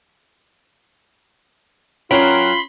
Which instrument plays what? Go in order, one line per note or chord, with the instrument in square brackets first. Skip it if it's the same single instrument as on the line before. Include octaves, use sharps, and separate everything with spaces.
[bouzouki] F#3 A#4 G5 [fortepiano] C#4 [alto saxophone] F4 [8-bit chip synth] B5 C6